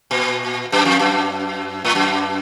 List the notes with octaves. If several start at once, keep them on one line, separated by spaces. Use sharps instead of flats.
A#2
F#2
F2
F#2
A2
F#2